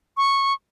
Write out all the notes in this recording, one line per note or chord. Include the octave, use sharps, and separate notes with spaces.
C#6